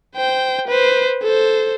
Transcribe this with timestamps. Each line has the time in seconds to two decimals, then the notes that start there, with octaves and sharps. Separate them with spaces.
0.16 C5 G5
0.68 B4 C5
1.23 A4 C5